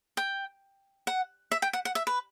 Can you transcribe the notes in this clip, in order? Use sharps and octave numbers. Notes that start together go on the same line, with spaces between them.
G5
F#5
E5
G5
F#5
F#5
E5
B4